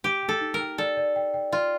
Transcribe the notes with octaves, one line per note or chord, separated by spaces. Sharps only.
G4 G5
G5
A4
D#4
A#4
G5
A4 D5
D5
G5
G5
F4 D5